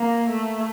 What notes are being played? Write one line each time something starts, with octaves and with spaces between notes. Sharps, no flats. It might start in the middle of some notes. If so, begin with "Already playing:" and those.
Already playing: A#3
A3